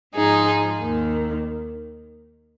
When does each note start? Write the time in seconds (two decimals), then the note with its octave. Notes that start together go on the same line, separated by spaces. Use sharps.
0.14 G#2 F3 D#4 G#4
0.80 D#2 D#3